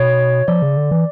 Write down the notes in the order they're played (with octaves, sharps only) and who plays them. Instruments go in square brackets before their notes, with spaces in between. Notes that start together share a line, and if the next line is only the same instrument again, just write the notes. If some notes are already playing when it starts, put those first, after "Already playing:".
Already playing: [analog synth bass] B2 [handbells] C#5
[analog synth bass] F3 [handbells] D5
[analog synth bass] C#3
D3
E3